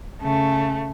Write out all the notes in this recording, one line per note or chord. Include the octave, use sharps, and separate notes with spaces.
C#3 A3